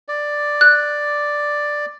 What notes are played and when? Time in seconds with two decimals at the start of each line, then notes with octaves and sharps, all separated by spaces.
0.08 D5
0.61 F#6